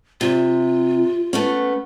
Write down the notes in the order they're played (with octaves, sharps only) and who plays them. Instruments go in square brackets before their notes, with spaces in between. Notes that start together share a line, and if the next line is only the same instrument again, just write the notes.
[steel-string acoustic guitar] C3 [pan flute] F4
[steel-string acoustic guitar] A3 B3 C#4